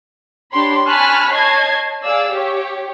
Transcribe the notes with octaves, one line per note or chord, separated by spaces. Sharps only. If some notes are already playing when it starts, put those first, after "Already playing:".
D4 G4 C#5 B5 C6
G#5 A5 B5 C#6 F6 F#6
C#5 D#5 A5 G#6 C7
G#4 D5 F5 E6
G4 C#5